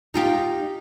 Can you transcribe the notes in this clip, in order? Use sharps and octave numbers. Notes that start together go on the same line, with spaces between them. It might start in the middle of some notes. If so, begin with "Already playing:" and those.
D#4 F4 G4